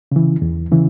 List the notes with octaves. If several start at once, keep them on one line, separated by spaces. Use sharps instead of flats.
C#3 E3
E2
C#3 E3